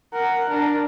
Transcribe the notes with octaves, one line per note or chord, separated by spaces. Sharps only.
A#4 F#5
D4 A#4